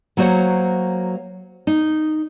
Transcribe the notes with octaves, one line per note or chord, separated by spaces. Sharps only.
F#3 A#3 F#4 C5 C#5
D#4